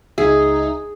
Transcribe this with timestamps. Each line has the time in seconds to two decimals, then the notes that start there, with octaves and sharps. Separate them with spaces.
0.18 C#2 D#4 G#4 E5